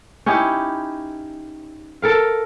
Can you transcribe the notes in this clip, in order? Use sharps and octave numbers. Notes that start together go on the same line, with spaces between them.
C#4 D#4 E4 G4
A4 A#4 F5